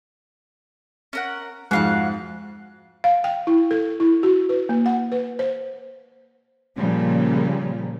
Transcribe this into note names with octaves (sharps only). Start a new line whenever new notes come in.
C#4 A#4 F#5
F2 G#2 F#4 F5 F#6
F5
G5
E4
A4
E4
F#4
B4
A#3
F#5
B4
C5
A#2 C#3 F3 G3